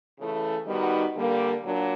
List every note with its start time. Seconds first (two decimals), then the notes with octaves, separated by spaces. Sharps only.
0.18 C#3 E3 A3
0.66 D#3 G3 B3 D#4 F#4
1.15 D3 G3 A#3
1.63 A#2 F#3 A#3 D4